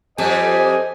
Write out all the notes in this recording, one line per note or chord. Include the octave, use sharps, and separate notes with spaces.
F2 G3 A4 C5 D#5 G#5